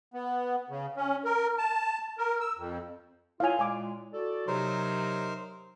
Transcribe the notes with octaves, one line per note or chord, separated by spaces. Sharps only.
B3
C#3
C#4
A#4
A5
A#4
E6
F2
E4 F4 C#5 F5 G#5 F7
A#2 G#3 G#5 D6
F#4 A4 D5
C3 F#3 D#4 A#4 C5